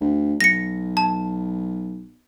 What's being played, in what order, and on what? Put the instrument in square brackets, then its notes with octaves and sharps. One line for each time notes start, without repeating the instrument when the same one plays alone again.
[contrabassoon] D2
[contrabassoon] B1 [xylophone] A#6 C#7
[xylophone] A5